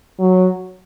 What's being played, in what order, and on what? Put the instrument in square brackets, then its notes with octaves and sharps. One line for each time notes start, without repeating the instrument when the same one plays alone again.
[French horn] F#3